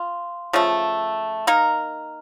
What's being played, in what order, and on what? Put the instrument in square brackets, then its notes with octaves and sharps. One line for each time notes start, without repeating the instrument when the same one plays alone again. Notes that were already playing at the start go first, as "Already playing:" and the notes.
Already playing: [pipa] F4
C#3 F3 A3
A#3 D#4 A#4